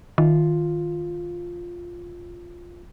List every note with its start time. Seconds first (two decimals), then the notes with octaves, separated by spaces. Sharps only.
0.18 D#3 F4